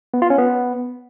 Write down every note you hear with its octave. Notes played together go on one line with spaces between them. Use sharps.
B3
F4
C#4
B3